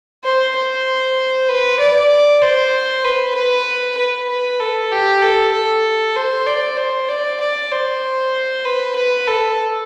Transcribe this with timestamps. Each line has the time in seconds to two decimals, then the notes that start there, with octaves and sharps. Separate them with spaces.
0.24 C5
0.56 C5
1.49 B4
1.80 D5
2.42 C5
3.05 B4
3.35 B4
3.98 B4
4.29 B4
4.60 A4
4.92 G4
5.22 A4
5.53 A4
6.16 C5
6.47 D5
6.78 C5
7.08 D5
7.40 D5
7.71 C5
8.65 B4
8.96 B4
9.27 A4